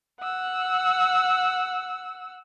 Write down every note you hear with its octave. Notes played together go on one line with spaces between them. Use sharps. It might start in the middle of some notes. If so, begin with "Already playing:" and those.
F#5 E6